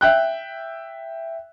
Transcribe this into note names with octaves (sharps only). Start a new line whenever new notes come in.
E5 G5 F#6